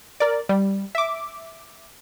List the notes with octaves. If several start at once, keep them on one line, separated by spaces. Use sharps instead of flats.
A#4 D5
G3
E5 D6